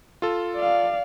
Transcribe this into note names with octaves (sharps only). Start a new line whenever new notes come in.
F4 A4
D5 F5